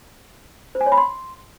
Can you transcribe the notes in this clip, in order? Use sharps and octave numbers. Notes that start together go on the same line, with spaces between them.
C5
G#5
C#5
B5
C6